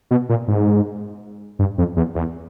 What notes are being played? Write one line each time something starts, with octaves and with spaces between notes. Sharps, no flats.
B2
A#2
G#2
G2
F2
E2
E2